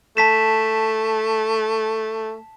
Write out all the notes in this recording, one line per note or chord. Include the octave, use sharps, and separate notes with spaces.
A3 A5 B6 E7